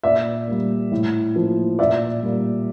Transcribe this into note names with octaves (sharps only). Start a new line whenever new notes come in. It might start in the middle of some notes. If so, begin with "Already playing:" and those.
A#2 D5 E5
G3 A#3
A2
F3 A#3
A#2 D5 E5
G3 A#3